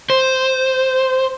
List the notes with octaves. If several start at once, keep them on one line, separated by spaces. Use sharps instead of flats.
C5